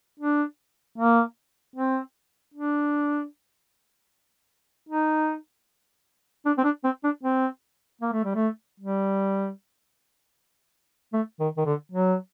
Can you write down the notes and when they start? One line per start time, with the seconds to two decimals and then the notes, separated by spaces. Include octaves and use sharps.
0.20 D4
0.98 A#3
1.76 C4
2.54 D4
4.89 D#4
6.46 D4
6.58 C4
6.64 D4
6.84 C4
7.04 D4
7.23 C4
8.01 A#3
8.13 A3
8.25 G3
8.35 A3
8.80 G3
11.13 A3
11.40 D#3
11.58 D#3
11.66 D3
11.92 F#3